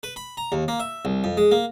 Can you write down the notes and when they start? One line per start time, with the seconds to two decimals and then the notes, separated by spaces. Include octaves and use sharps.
0.03 B4
0.16 B5
0.37 A#5
0.52 D#2
0.68 A#3
0.80 E5
1.05 C2
1.24 F2
1.37 G#3
1.51 A#3